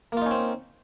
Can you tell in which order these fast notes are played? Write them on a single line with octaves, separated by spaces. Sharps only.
A#3 F4 D#4 C#4 C4